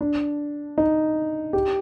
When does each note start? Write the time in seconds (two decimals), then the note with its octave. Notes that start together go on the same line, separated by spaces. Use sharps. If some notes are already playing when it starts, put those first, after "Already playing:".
0.01 D4
0.78 D#4
1.53 G4